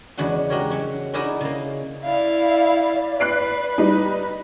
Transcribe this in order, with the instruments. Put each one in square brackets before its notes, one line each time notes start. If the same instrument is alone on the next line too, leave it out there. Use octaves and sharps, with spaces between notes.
[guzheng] E2 C#3 G#3 D4 F#4 F#5
G#3 F#4 G4 A#4 C#5
F#3 C#4 C#5
D#4 E4 F#4 G#4 A#4 D5
C#3 A#3
[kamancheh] E4 F5 [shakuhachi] D5
[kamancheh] B4 [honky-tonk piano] F#6 C7 D7
[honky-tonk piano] G3 D#4